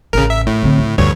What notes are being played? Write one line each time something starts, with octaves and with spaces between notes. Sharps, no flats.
A1 C#3 A#4
E5
A2
D3 C4
D2
D2 G2 E3 C#5